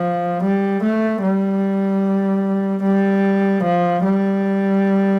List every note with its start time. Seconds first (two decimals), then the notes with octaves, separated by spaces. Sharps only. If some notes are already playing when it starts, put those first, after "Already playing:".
Already playing: F3
0.43 G3
0.83 A3
1.23 G3
2.83 G3
3.64 F3
4.04 G3